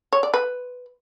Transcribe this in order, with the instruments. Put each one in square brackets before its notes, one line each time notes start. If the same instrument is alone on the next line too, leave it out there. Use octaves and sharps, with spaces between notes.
[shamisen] C#5
D5
B4